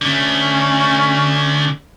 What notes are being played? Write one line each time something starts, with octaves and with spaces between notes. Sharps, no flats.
D3 A3 C#4